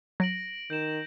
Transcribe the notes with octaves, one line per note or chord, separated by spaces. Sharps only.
F#3 A#6 D7 F#7
D#3 G6 D7 E7